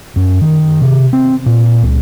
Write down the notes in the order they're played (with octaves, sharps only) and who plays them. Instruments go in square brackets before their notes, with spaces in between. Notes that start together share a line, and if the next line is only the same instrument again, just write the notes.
[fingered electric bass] F#2
D#3
C3
C4
A#2
C#2